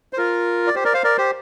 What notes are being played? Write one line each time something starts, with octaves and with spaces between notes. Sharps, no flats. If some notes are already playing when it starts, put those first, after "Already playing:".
C5
F4 A#4
D5
G4 C5
A#4 D5
C5 F5
A#4 D5
G4 C5